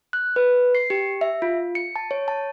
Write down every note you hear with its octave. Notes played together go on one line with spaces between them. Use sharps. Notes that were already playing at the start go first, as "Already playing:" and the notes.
F#6
B4
C7
G4
E5
F4
C#7
A5
C#5
A5